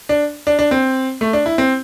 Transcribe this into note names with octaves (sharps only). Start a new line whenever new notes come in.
D4
D4
D4
C4
A3
D4
E4
C4